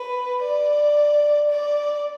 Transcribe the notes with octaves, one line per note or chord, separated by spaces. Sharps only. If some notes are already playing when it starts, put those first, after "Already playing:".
Already playing: B4
D5
D5